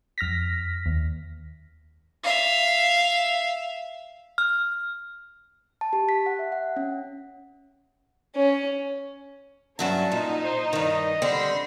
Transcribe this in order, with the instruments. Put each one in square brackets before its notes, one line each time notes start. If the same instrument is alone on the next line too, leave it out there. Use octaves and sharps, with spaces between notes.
[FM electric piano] F2 F6 A#6 B6
D#2
[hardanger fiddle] E5 F5
[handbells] F6
[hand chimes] A5
G4
B6
F#5
E5
F#5
C#4
[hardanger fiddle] C#4
[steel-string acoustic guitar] G2 F#3 E5 [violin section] C#4 [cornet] A5
[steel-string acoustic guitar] A#2 [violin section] D#4
[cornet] C5
[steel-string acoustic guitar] G2 D#3 [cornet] D#5
[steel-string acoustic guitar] D3 G3 C4 [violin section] B5 C6 A#6